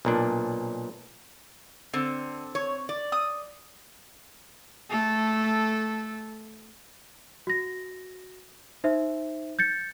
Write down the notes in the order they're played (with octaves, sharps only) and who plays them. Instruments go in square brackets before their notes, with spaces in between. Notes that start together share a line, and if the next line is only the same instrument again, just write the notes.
[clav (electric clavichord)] B1 A#2 D4
[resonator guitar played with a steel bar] D3 [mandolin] C4
[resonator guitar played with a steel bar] C#5
D5
[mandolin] D#6
[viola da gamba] A3 A4
[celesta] F#4 A#6
D#4 C5 E5
G6 A6 C#7